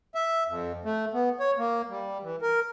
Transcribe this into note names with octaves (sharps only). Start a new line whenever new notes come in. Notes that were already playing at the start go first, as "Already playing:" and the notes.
E5
F2
A3
B3
C#5
A#3
G3
E3
A#4